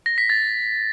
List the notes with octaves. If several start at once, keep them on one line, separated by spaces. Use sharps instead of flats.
A#6
B6
A6